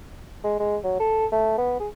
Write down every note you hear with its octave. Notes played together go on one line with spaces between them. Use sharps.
G#3
G#3
F#3
A4
A3
B3
G#4